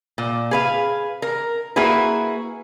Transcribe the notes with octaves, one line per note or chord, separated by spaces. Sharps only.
A#2
G#4 B4 F5
A#4
A#3 E4 F#4 G#4 B4